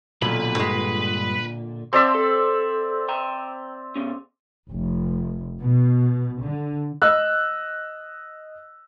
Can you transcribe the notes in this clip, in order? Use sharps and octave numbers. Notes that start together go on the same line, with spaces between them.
B1 A#2 D3 B4 B5
G2 G#3
C4 D5 E5 A5 C6
A4
G5 A#5
B2 C#4
F1
B2
D3
D#5 E6 F#6